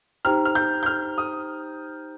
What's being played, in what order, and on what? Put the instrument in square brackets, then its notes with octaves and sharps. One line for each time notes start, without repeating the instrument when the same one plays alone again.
[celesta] D#4 G4 C5 G5 A#5 [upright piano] F6
[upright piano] F6
G6
G6
F6
D#6